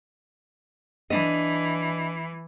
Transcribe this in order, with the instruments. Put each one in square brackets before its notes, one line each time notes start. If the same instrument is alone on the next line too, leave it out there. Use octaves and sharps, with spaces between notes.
[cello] E3 [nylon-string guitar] D4 D#5